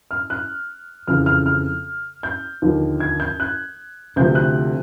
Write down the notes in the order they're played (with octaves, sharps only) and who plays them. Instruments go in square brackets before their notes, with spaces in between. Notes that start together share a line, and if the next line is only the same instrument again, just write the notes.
[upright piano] F6
F#6
F2 C#3 E3 F6
F6
F6
G6
D#2 D3 F3
G#6
G6
F#6
D2 C3 F3 G6
F#6